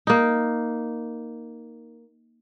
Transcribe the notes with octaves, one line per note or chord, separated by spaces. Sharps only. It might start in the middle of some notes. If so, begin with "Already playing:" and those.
A#3 D#4